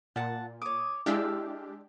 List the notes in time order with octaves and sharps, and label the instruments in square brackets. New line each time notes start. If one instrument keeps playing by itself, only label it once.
[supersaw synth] A#2 [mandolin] F#5 A5
[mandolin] C#5 D6 [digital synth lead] D#6
[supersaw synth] G#3 D4 G4 [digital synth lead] E4 [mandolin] F5 E6